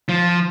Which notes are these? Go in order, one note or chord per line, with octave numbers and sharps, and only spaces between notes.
F3